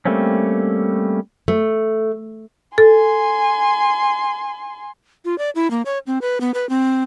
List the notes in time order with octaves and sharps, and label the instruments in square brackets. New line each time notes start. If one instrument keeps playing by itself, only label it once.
[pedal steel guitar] G3 A3 A#3 C4 C#4
[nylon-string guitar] A3
[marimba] A4 [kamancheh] G#5 C6
[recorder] F4
D5
E4
A#3
C#5
C4
B4
B3
B4
C4